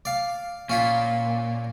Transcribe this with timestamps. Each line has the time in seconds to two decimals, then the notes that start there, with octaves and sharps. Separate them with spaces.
0.05 D5 F5
0.69 A#2 C#4 F4 B5